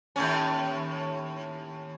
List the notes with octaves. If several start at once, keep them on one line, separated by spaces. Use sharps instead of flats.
D#2 A2 C#4